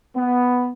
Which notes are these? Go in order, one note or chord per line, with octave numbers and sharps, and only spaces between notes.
B3